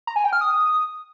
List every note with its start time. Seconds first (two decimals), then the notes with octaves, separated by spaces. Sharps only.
0.07 A#5
0.16 G#5
0.24 G5
0.33 F6
0.41 D#6